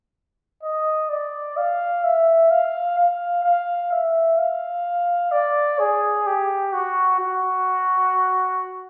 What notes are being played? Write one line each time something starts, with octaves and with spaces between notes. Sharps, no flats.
D#5
D5
F5
E5
F5
F5
F5
E5
F5
D5
G#4
G4
F#4
F#4